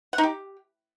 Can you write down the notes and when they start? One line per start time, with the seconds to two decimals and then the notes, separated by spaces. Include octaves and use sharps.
0.13 F#5
0.18 D#4
0.23 G4